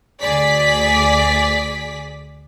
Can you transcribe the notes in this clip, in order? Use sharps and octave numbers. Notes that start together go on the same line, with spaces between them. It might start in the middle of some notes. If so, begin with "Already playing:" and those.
D2 G#4 D5 B6